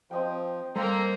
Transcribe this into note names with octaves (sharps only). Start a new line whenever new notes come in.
F3 C4 D#5 G5
G3 A#3 A4 A#4 C5 F5 G5 A#5